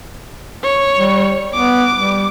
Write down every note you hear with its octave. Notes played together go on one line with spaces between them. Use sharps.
C#5
G3
B3 D6
G3